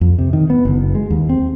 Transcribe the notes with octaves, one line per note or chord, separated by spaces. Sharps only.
F2
C3
D#3
B3
F#1
G#3
D#2
C4